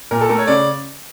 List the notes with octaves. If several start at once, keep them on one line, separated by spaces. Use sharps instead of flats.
A#2 A#4
A4
A3 A#4
C#5
C#3 D5